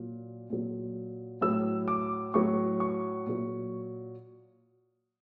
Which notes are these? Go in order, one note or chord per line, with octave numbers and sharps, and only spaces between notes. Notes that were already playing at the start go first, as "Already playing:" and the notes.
Already playing: A#2 F#3
A#2 F#3
A2 F#3 E6
D6
A2 F#3 C#6
C#6
A#2 F#3